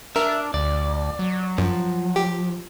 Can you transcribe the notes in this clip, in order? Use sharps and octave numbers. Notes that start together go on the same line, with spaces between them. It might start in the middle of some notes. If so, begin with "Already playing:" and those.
D4 A#4 E5
D2 D5
F#3
F#2 F3
G4